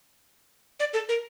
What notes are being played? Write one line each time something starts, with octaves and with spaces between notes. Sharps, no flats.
D5
A4
A#4